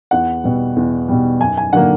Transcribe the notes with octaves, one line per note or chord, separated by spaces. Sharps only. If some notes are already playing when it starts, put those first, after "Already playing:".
E2 F#5
B2 G3
E2
B2 G3
F#2 G#5
G#5
D3 F#3 A#3 F#5